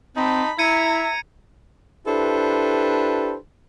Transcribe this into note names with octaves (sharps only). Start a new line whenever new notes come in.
C4 D#4 A5 B5
E4 E5 A#5 G#6 C#7 D#7
D4 E4 G4 A4 B4 C5